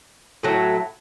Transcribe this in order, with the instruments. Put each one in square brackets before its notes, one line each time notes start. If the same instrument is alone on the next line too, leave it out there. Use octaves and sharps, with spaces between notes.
[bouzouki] A2 F#3 A3